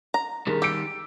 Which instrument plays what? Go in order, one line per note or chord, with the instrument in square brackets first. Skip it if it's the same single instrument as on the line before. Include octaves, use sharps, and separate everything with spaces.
[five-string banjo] A#5
[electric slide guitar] D#3 G3 [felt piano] G#4 A#4
[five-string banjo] G4 [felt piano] E6 D7